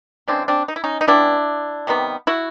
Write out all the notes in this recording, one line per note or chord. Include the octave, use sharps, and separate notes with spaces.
C#3 E3 G#3 C4 D4
C4 D4
D#4
E4
C#4 D#4
D#4
C#3 E3 G3 B3 D4 E4
C3 D#3 G3 B3
E4 F#4